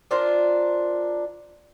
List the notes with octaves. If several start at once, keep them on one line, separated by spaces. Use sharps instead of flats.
D4 F4 A#4 C5